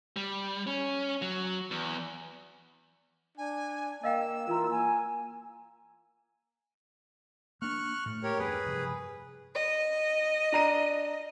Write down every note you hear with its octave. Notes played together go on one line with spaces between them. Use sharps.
G3
C#4
F#3
E2
D4 G#5
A#3 D#5 F5 G5 E6
E3 F4 A#4 A#5
A#3 G#5
A#3 D4 C#6 F6 F#6
A2 A3
G4 A#4 C#5
E2 G2 G#4 B4
F1 G2
D#5
D4 A#5 D#7